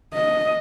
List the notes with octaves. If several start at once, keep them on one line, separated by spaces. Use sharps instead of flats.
D#5